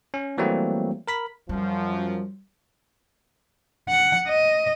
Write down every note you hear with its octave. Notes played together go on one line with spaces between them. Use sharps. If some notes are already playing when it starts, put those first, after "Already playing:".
C#4
E3 F#3 G3 A3 A#3 C4
A#4 B5 B6
F#2 F3 G3
F#5
D#5